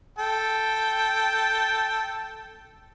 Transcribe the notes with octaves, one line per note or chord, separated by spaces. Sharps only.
A4 G5